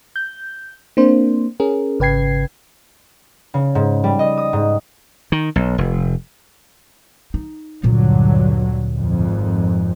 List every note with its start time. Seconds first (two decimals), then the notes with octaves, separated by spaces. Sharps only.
0.16 G6
0.97 A#3 C4 D4 C5
1.60 C#4 G#4 A#4
1.99 G#1 C#3 B4 G5 G#6 C7
3.54 C#3
3.75 G#2
4.04 G3
4.19 D#5
4.38 D#6
4.53 G#2
5.32 D#3
5.56 B1
5.78 F1
7.34 D#4
7.83 D2 G2 A#2 D3 F#3
8.97 G#1 F2